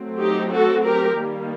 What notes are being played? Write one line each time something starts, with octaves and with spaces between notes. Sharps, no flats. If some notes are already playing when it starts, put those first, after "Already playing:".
Already playing: F#3 A3 C4
D#4 G4
F#4 A4
G4 A#4
D#3 G3 A#3